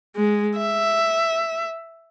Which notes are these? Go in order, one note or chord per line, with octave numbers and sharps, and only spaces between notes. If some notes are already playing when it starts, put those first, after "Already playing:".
G#3
E5